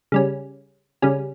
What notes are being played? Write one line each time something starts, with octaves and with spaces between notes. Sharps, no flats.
C#3 G3 C#4
C#3 G3 C#4